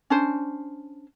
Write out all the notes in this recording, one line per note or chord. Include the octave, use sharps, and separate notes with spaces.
C#4 D4 C5